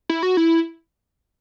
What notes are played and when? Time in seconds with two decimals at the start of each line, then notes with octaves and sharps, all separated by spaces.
0.09 E4
0.23 F#4
0.37 E4